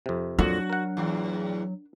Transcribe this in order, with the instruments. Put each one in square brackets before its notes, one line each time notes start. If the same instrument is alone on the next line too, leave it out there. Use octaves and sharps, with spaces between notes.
[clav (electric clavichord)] F2 C3
[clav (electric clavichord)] F2 A#2 [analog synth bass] F#3 [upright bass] D4 [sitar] F#4
[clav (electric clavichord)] A#4 F#5
[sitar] E2 A2